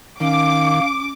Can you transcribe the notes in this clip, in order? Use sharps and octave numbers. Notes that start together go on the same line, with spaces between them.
D#3 C#4 F5 D6